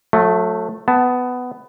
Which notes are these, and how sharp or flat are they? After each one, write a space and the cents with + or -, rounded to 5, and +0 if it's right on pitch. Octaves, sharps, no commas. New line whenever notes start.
F#3 -35 A3 +0
B3 +15 A5 +0